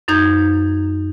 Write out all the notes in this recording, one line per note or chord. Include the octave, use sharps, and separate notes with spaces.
F#2 D#4 G6 G#6